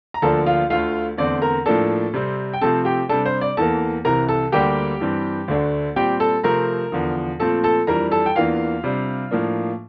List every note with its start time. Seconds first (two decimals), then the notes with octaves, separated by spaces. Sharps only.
0.14 A#5
0.22 D2 D3 F3 A#3 D4 A4 A5
0.46 F4 F5
0.70 D2 D3 A3 F4 F5
1.17 E2 D3 A3 C4 D5
1.42 A#4 A#5
1.66 A2 F3 A#3 D4 A4 A5
2.14 C3 G3 C4
2.53 G5
2.61 C3 F3 A3 C4 A4 A5
2.85 G4 G5
3.09 C3 G3 D4 A4 A5
3.26 C5
3.41 D5
3.57 E2 E3 A#3 A4 A5
4.05 C2 C3 E3 A#4 A#5
4.29 A4 A5
4.52 D2 D3 G3 A#3 G4 G5
5.00 G2 E3 G3 C4
5.48 D2 D3 A3 D4
5.96 A#2 G3 C4 G4 G5
6.20 A4 A5
6.44 C3 F3 A3 C4 A#4 A#5
6.92 E2 D3 F3
7.40 A#2 F3 A3 C4 A4 A5
7.64 A4 A5
7.87 F2 E3 G3 D4 A#4 A#5
8.11 A4 A5
8.26 G5
8.36 E2 E3 A#3 D4 F4 F5
8.84 C3 G3 D4
9.31 A2 F3 A#3 D4